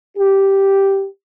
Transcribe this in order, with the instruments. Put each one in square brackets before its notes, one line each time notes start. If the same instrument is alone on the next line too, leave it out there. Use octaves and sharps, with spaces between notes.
[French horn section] G4